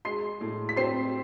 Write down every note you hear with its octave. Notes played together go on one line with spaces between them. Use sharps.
G#3 C6 C7
A2
B6
C4 C6 C7